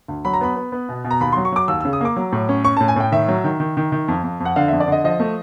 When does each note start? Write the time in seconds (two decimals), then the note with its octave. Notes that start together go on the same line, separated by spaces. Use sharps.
0.08 D2
0.25 F#3 B5
0.33 A#5
0.41 B3 B5
0.56 B3
0.72 B3
0.89 B2
1.04 B2
1.11 A#5
1.20 D#2 B5
1.33 C6
1.37 F#3
1.45 C#6
1.52 F#3 D6
1.68 D#2 E6
1.81 E6
1.85 C#3
1.93 D#6
2.01 A#3 D6
2.16 F#3
2.32 A2
2.49 C#4
2.64 C#4 C#6
2.77 A5
2.80 A2
2.88 G#5
2.96 A2 G5
3.12 D#3 E5
3.29 F#3
3.44 D#3
3.60 D#3
3.77 D#3
3.92 D#3
4.08 F2
4.24 F2
4.40 F2
4.45 F#5
4.56 D3 F5
4.68 E5
4.72 F2
4.80 D5
4.88 D3 D#5
5.04 F3 D#5
5.20 A3